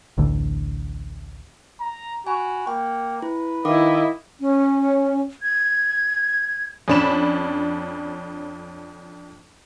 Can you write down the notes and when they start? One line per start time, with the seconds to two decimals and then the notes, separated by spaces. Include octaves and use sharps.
0.18 A1 D2 D3
1.81 A#5
2.27 F#4 G#5 B5
2.67 A#3 G5
3.22 E4 B4
3.65 D#3 E4 A#4 D#5 F5 D6
4.39 C#4
5.41 G#6
6.88 F2 C#4 D4 B5 E7